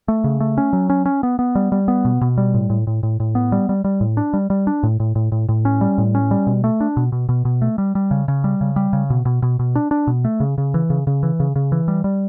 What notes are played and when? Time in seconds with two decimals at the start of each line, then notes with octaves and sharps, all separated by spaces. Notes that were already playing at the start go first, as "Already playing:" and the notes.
0.08 A3
0.24 C#3
0.40 A3
0.58 C#4
0.73 F#3
0.90 C#4
1.06 C#4
1.23 B3
1.39 B3
1.55 G3
1.72 G3
1.88 B3
2.05 B2
2.21 B2
2.38 G3
2.54 A2
2.70 A2
2.87 A2
3.03 A2
3.20 A2
3.35 B3
3.52 G3
3.69 G3
3.84 G3
4.01 A2
4.17 D4
4.33 G3
4.50 G3
4.67 D4
4.83 A2
5.00 A2
5.15 A2
5.32 A2
5.49 A2
5.65 C#4
5.81 G3
5.98 A2
6.15 C#4
6.31 G3
6.47 B2
6.64 A3
6.81 D4
6.97 B2
7.12 B2
7.29 B2
7.45 B2
7.62 A3
7.78 G3
7.95 G3
8.11 C#3
8.28 C#3
8.44 G3
8.61 C#3
8.76 G3
8.93 C#3
9.10 B2
9.25 B2
9.42 B2
9.59 B2
9.75 D4
9.91 D4
10.07 B2
10.25 A3
10.40 C#3
10.58 C#3
10.74 E3
10.90 C#3
11.07 C#3
11.23 E3
11.40 C#3
11.56 C#3
11.72 E3
11.88 G3
12.04 G3